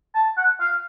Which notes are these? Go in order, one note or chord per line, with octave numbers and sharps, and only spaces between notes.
A5
F#5
F5